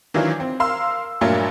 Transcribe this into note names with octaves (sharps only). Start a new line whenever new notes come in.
D#3 E3 F#3 D4 F4
C4
A#4 F5 C6 E6
G2 A#2 F#3 A3 A#3 F4